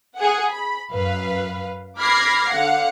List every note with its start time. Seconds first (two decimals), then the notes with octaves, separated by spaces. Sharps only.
0.17 G#4 F#5
0.51 B5
0.93 F#2 B4 F5
2.00 B5 D6 F6 G#6 A#6 C7
2.51 D3 F5 F#5